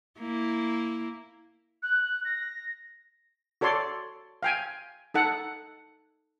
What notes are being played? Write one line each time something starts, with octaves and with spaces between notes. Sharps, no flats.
A#3 E4
F#6
A#6
F#4 A4 C#5 D5 C6
F5 G5 G#5
D#4 A4 F#5